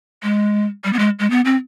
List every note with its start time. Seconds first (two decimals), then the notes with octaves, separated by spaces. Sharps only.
0.23 G#3
0.84 G3
0.93 B3
0.99 G#3
1.19 G#3
1.30 B3
1.45 C4